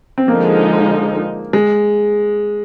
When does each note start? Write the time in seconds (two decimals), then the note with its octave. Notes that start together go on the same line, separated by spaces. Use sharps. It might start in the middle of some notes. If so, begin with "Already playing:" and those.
0.18 C4
0.28 D3 F3 G#3 A#3 D#4
1.53 G#3